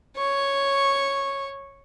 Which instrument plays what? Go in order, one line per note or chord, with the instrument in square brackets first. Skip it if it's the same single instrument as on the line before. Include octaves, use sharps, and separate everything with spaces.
[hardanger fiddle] C#5 C#6